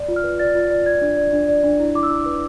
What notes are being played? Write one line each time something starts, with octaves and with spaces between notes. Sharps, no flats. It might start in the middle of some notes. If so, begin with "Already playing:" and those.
Already playing: D5
F4
F6
B4
D5 A6
F4
D5
D5 G#6
D4
D5
D4
D5
D4
E4
E4 D6
E6
E4
B4